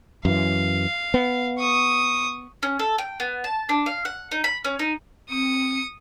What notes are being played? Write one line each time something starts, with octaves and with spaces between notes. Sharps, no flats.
F#2 E3 F5
B3
C#6 D#6
C#4
A4
G5
B3
A5
D4
F5
F#5
D#4
B5
C#4
D#4
C4 D#6 C#7